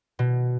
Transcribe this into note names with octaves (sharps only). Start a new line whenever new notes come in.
B2